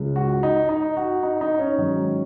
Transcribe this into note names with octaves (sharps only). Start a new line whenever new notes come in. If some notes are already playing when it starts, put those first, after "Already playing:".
Already playing: C#2 C#3 G#3
F#4
F#4
D#4
D#4
F#4
D#4
D#4
C#4
G#2 D#3 F#3